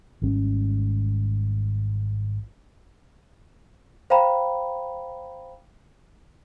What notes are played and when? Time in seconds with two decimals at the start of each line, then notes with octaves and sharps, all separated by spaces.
0.22 G#1 G#2 G3 C#4
4.10 C5 F5 G5 A#5 B5